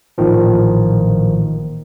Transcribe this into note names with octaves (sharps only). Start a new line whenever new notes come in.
A1 A#2 D#3 F3